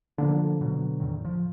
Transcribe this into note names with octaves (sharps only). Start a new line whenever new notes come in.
D3 F3 A#3 D4
B2 F#3
E2 A2 D#3
F3